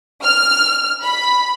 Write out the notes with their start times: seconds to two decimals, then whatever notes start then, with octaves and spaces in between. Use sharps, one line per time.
0.24 F6
1.02 B5